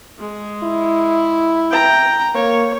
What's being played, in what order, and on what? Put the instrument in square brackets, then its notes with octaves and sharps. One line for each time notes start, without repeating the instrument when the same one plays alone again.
[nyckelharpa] G#3
[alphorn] E4
[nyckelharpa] G5 A#5
[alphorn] A#3 [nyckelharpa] C#5